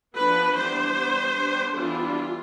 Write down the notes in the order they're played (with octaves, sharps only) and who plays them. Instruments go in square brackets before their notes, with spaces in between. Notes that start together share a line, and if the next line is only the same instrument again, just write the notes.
[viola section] F3 B3 D4 B4
E3 G3 B3 D4 C5
G3 B3 D4
G3 B3 D4
E3 G3 B3 D4 F4